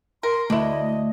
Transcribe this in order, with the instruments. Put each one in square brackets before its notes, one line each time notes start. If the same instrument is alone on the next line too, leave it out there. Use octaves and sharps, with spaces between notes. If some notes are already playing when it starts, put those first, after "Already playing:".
[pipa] A#4 [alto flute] C6
[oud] D2 [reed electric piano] A3 [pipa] D4 E4 [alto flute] D#5